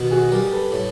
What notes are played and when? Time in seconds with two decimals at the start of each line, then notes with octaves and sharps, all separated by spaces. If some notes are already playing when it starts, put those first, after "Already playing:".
Already playing: B2 D#3
0.11 F#4 G#4
0.31 G3 G#4 A#4
0.52 A4 B4
0.72 A2